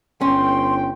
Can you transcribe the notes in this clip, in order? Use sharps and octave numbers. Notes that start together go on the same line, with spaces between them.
G1 C#4 G5 C6